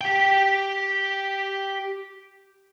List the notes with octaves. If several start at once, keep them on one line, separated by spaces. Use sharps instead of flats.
G4 G5